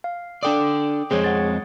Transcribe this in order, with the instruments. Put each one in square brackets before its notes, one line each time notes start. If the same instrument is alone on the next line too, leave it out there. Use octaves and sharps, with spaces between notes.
[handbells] F5
[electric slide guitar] D4 A4 D5 [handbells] G5 D6 D#6
[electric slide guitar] F2 G#3 C4 [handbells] G#4 C#5
[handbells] F#5 A6